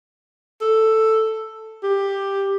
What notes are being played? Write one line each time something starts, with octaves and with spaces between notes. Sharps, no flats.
A4
G4